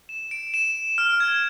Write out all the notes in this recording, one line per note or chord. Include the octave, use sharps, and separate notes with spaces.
E7
D7
E7
F6
G#6